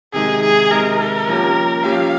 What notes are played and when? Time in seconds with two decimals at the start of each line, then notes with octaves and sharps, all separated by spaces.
0.13 C3 D#3 G#3 G#4
0.42 G#4
0.70 C3 D#3 G#3 A#4
1.27 F3 A#3 C#4 G4
1.84 F3 A#3 C#4 G4 F5